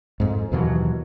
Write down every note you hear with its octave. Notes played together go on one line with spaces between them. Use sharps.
F2 G#2
D#2 B2 E3 F#3